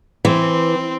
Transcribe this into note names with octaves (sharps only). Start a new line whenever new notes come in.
E3 C4